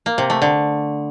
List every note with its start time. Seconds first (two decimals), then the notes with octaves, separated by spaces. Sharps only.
0.06 A#3
0.18 C3
0.30 A3
0.42 D3